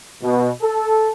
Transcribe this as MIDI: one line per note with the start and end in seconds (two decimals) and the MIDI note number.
0.23 0.50 47
0.61 1.11 69